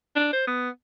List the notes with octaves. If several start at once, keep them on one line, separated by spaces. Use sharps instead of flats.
D4
C5
B3